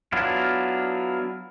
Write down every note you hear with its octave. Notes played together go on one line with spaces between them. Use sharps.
F#3 B3 D4 E4 F4